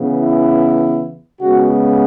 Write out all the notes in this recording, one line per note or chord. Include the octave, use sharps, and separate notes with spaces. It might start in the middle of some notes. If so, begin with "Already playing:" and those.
Already playing: C#3 E3 B3
E4
C#3 G#3 B3 F#4